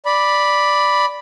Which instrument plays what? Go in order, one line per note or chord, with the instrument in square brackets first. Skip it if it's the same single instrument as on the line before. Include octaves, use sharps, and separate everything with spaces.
[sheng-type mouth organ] D5 B5